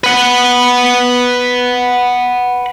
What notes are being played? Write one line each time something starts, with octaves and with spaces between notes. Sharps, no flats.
B4 F#5